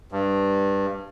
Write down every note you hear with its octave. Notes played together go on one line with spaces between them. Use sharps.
G2